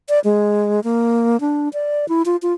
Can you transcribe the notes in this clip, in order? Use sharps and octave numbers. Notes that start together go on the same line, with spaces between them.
D5
G#3
A#3
D4
D5
E4
F4
F4